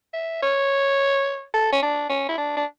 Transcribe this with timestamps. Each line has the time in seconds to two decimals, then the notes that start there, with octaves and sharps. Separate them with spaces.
0.14 E5
0.43 C#5
1.54 A4
1.73 C#4
1.82 D4
2.09 C#4
2.29 E4
2.38 D4
2.57 D4